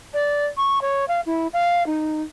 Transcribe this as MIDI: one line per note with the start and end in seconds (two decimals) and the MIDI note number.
0.13 0.46 74
0.57 0.79 85
0.81 1.05 73
1.08 1.21 77
1.26 1.47 64
1.53 1.86 77
1.86 2.22 63